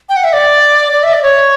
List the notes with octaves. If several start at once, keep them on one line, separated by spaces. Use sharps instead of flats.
G5
F#5
E5
D5
D5
E5
D5
C#5